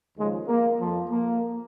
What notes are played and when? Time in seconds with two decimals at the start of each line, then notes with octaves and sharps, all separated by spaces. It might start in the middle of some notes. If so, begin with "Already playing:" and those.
0.17 D#2 C#3 F3 G#3
0.47 A#3
0.79 F2 F3
1.09 A#3